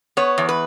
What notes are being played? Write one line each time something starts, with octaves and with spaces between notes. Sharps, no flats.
B3 C#5
E2
B4